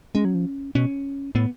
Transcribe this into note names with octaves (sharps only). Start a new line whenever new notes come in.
G#3 C#4
F#3
F3
B2 C#4
A2 B3